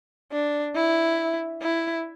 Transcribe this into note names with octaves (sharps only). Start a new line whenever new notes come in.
D4
E4
E4